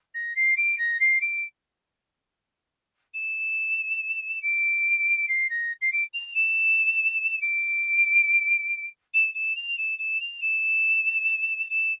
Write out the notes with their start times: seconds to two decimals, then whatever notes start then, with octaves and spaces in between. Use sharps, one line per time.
0.14 A#6
0.35 C7
0.57 D7
0.78 A#6
1.00 C7
1.21 D7
3.13 E7
4.41 D7
5.28 C7
5.49 A#6
5.81 C7
5.92 D7
6.13 F7
6.34 E7
7.41 D7
9.13 E7
9.34 E7
9.55 F7
9.77 E7
9.98 E7
10.20 F7
10.41 E7
11.69 E7